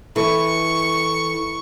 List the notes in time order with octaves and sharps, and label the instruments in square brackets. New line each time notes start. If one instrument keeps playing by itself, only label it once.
[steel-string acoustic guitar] E3 [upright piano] A4 [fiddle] C#6